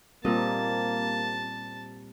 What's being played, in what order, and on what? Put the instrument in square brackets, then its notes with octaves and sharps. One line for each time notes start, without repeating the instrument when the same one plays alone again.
[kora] A#2 D#5 [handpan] G3 C4 G4 [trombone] A#3 [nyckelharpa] A5